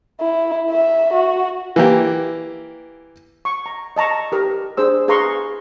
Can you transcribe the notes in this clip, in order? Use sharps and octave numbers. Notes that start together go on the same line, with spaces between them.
E4
E5
F#4
E3 A#3 G4
C#6
A#5
D#5 A5 A#5 C#6
G4 A#4 B4
D4 G#4 C5 E6
G#4 B4 F5 A#5 C6 C#6